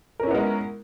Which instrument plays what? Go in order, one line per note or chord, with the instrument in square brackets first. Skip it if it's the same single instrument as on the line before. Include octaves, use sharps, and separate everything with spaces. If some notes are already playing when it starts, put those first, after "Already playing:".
[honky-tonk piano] A#4
C#4
E4
B3
G#3